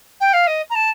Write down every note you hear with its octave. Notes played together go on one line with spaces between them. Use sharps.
G5
F5
D#5
A#5
A5